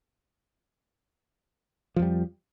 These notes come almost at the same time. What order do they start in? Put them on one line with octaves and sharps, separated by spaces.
F3 F2 G3